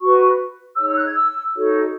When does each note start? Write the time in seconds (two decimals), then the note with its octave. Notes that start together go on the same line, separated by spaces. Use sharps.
0.01 F#4 B4 C#6
0.77 D#4 G#4 C#5 E6
0.87 E6
0.96 F#6
1.05 G#6
1.15 E6
1.53 D#4 F#4 A4 C#5